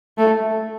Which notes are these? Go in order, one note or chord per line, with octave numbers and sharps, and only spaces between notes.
A3